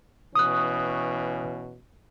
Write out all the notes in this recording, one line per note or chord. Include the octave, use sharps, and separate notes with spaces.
B2 E3 C#4 D#6 F#6